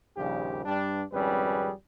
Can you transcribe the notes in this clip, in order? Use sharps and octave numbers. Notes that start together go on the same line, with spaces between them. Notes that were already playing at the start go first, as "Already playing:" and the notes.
A#1 D#2 C#3 F3 G3 G4
G2 G3 D4
G#1 F2 G3 C#4 G#4 B4